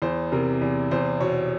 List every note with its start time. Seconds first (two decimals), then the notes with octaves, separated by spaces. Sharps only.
0.02 E2 C5
0.32 C3 A#4
0.61 E2
0.91 E2 C5
1.20 B2 C#5